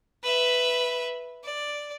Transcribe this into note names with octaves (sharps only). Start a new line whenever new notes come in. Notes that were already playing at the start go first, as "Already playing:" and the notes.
B4 E5
D5